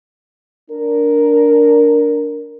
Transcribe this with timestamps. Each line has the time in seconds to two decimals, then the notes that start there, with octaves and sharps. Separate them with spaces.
0.71 D4 A#4